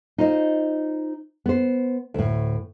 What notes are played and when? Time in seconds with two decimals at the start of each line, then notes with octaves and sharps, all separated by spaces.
0.18 D#4 F4 C5 D#5
1.46 B3 C5
2.14 D2 A2